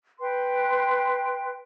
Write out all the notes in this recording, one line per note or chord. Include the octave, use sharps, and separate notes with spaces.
B4 G5 C6